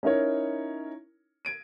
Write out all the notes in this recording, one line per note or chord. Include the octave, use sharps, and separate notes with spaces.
C#4 D#4 E4 A#4 C#5
G#6 D7 D#7